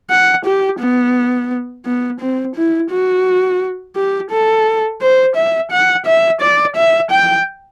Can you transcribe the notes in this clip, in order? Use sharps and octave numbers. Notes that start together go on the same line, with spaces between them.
F#5
G4
B3
B3
C4
E4
F#4
G4
A4
C5
E5
F#5
E5
D5
E5
G5